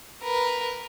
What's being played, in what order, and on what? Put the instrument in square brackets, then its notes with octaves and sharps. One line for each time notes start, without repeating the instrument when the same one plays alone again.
[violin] A#4 B4